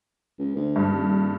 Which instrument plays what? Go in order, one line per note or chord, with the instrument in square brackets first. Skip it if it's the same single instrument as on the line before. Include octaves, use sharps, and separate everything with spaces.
[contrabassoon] C#2
D2
[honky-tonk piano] G2
[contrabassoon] D#1